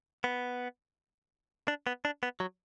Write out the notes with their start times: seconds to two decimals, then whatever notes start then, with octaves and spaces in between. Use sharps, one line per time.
0.24 B3
1.68 D4
1.87 B3
2.05 D4
2.23 B3
2.40 F#3